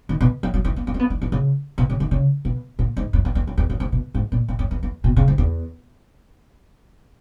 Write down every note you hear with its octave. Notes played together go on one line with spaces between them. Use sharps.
D#3
B2
F#3
F#3
E3
B3
A#3
C#4
B3
E3
E3
C#3
B2
C#3
D#3
C#3
B2
A#2
G#2
F#2
E2
E2
F#2
E2
F#2
G#2
B2
G#2
A#2
A#2
F#2
E2
E2
B2
C#3
G#2
E2